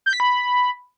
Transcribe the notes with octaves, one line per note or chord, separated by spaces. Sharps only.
G6
B6
B5